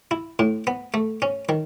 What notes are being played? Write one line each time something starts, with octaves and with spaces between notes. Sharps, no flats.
E4
A2
B3
A3
C#4
D#3